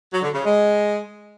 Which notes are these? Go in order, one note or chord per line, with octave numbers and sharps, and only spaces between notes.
F#3
D3
C#3
G#3